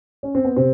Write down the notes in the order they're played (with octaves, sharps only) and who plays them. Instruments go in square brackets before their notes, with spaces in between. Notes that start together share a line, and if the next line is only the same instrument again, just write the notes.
[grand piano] C#4
C4
B3
C3 C4